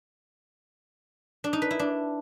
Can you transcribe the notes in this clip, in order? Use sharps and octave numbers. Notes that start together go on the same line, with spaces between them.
D4
D#4
B4
E4
D4